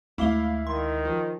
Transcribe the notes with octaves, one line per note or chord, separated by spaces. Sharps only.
D2 G#3 A3 E4 F5 D6 G7
D#3 C6
F3